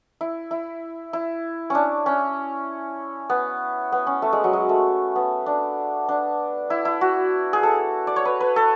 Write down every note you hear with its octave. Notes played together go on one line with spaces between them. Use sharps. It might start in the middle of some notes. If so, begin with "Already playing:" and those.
E4
E4
E4
C#4 D4
C#4
B3
B3
C#4
A3
G#3
F#3
G#3
A3
B3
D4
D4
E4
E4
F#4
G#4
A4
D5
C#5
B4
B4
A4